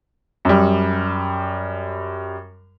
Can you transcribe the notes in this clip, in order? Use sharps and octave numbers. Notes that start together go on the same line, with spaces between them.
F#2 G3